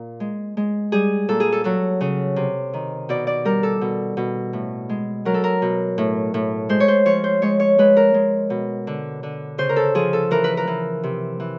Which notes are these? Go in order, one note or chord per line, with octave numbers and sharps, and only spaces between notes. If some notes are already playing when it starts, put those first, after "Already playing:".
Already playing: A#2
G#3
G#3
G3 G#4
A#2 A4
G#4
A4
F#3 A4
C#3
C3
D#3
B2 D5
D5
G3 A#4
A4
B2
B2
A2
G#3
F#3 A#4
A4
A#4
B2
A2
A2
G#3 C5
C#5
C5
F3 C#5
C5
G#3 C#5
C#5
G#3 B4
A#4
G#3
B2
D3
D3
C#3 C5
A#4
A4
F3 G#4
A4
E3 A#4
B4
A#4
E3
C3
E3